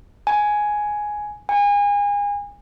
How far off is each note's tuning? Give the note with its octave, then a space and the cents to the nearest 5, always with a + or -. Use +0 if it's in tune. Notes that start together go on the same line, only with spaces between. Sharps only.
G#5 +5
G#5 -30